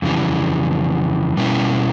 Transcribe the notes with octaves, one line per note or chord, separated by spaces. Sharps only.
F2 C#3 E3 G3
B2 G3 A#3 C#4 E4